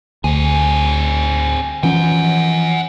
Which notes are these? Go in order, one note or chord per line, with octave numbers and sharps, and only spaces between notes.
D2 C4 G#4
E3 F3 C#4 F#5 G#5